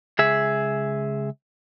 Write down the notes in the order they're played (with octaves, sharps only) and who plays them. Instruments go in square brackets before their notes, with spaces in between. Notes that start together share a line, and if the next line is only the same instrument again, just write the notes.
[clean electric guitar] C#2 G#4 E5